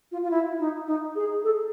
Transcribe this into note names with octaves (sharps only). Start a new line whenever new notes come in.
F4
F4
E4
D#4
D#4
G#4
A4